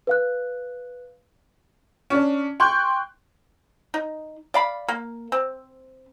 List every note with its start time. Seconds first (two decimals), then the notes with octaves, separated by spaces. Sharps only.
0.07 B4 F5 F#6
2.10 C#4 D4
2.60 G5 C6 C#6 F#6 G6
3.94 D#4
4.54 D5 F5 B5
4.88 A#3
5.32 C4